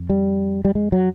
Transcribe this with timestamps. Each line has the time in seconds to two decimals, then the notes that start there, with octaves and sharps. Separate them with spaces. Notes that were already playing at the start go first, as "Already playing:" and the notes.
Already playing: F2
0.10 G3
0.65 G3
0.75 G#3
0.92 F#3